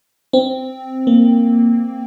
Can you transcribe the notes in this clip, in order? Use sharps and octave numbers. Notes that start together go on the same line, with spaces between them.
C4
A#3